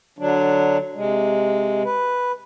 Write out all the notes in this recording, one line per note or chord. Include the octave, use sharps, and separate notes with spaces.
D3 F#3 D4
C3 G#3
B4